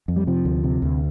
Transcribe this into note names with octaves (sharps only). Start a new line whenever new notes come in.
F2
G3
C3 F3
D2
C3
D2